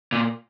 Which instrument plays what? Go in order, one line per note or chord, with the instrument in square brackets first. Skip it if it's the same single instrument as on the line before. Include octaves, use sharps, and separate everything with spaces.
[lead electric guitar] A#2